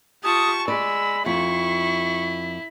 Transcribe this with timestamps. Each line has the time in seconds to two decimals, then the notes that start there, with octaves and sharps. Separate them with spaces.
0.24 F4 G4 A5 C#6 D#6
0.68 G#3 D5 B5 E6
1.26 F2 E4 C#6 B6